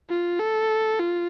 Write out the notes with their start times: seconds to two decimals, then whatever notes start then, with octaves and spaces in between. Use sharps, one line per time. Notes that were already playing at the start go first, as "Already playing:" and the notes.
0.09 F4
0.39 A4
0.99 F4